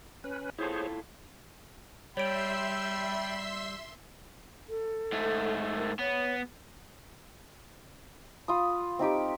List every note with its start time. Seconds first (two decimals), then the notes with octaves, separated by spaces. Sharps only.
0.24 C#4 B4
0.58 E4 F4 G#4 A4 C5 C#5
2.17 G3 C#5 E5 G5 B5 C6 E6 D7
4.69 A4
5.12 G#2 A3
5.77 A#4
5.99 B3 C#5
8.48 F4 B5 D#6
8.99 C4 D#4 G4 D6